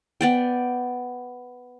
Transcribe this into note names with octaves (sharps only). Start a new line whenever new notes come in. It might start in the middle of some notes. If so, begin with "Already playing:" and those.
B3 D5 G5